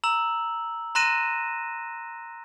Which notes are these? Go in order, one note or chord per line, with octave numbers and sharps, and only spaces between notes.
A#5 E6 F#7
A#5 C6 F#6 A#6 D#7 E7